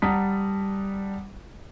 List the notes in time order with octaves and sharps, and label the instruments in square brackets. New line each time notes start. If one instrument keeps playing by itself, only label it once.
[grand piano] G3 F#5 A5 A#5 D#6 B6